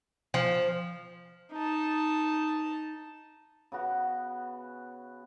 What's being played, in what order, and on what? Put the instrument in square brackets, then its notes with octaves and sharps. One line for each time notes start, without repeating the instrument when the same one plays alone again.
[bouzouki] F3
[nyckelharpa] D#4 A5
[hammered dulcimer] C#3 B3 F#4